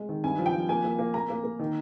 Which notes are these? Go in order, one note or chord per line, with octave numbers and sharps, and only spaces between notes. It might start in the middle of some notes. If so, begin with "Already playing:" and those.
Already playing: G#3
D#3
G2 G#5
F3
G5
F3
A#3 G#5
A#3
A#3
A#3 A#5
A#3
A#3
D#3